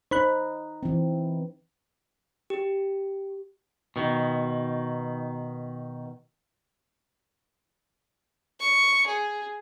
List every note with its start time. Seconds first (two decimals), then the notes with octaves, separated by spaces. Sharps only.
0.11 D#4 C5 B5 F#6
0.83 E3 C4
2.50 G4
3.96 B2 D#3
8.60 C#6
9.07 G#4